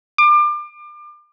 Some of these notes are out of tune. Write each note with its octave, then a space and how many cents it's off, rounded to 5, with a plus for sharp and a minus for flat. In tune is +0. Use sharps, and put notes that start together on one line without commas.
D6 +30